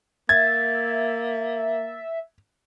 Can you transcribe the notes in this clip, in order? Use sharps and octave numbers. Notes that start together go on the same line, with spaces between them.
A#3 E5 G#6 A6